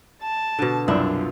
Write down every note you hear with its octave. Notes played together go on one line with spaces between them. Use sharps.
A5
B2 D3
C2 F#2 D4 E4 F4